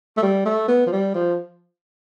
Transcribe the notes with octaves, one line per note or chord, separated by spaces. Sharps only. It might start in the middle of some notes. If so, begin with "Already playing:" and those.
A3
G3
A3
B3
F3
G3
F3